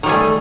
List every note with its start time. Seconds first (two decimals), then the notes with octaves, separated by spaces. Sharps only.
0.03 D#3
0.06 G3
0.09 G#4
0.12 A3